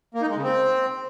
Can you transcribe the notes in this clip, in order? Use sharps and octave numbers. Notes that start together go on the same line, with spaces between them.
A#3
D#4
G#3
C#3
C4